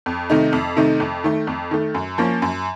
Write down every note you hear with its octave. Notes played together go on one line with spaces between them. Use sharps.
F2
C3 D#3 A3 D#4
F2
C3 D#3 A3 D#4
F2
D#3 A3
F2
D#3 A3
F#2
F3 A#3 C#4
F#2